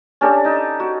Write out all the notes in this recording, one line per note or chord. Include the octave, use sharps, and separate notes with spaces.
C#4 D4 G4 A4
D#4
F#4